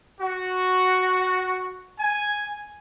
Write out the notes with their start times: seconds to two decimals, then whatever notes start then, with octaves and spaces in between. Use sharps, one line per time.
0.19 F#4
1.99 G#5